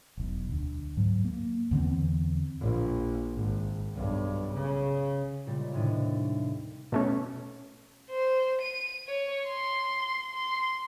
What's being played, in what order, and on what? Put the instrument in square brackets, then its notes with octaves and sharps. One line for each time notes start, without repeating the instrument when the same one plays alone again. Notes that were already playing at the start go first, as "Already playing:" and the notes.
[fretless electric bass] E1 B1
D2
G#2 F#3
A#3
E2 D3 E3 C4
[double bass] A#1
G#1
B1 G2
C#3
[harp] A#2 C#3 G3 G#3
D#2 A2 C3 D4 D#5
[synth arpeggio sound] B2 A3 C#4
[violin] C5
D#7
C#5
C6
C6